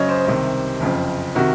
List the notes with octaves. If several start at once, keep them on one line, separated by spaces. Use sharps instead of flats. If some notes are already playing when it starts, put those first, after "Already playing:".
Already playing: F#1 F#2 C#3 C#5 D#5
C5
C2 C3 D#3
F#1 F2 C#3
C3 D#3 F#4